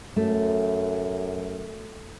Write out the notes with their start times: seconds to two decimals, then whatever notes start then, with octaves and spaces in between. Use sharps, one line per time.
0.16 F#2 A3